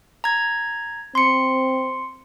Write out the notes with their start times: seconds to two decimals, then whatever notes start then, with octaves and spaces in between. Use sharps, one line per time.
0.24 A#5 G#6
1.15 C4 C6 C#7